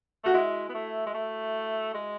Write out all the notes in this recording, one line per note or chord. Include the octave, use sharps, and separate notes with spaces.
A3 F#4
G#3 E4
B3
A3
G#3
A3
G#3